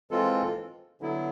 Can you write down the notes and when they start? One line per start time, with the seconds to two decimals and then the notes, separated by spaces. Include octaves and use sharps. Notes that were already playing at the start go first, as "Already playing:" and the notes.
0.11 E3 G#3 C4 F4 A4
1.01 D3 F#3 B3 E4